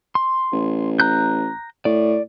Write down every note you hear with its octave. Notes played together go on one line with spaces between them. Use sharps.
C6
A1
A#5 F#6 G6
A2 D5